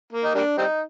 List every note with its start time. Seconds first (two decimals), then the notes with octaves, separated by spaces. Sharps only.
0.12 A#3
0.24 D#4
0.35 G3 A#3 D4
0.58 G3 C4 D#4